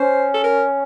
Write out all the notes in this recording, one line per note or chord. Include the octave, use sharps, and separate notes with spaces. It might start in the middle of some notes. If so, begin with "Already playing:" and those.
Already playing: C#4 C5
A4
A#4